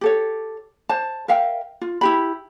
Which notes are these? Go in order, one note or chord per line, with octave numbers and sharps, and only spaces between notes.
G4 A4 C#5
C5 A5
A#4 E5 F5 G5
F4
E4 G4 B5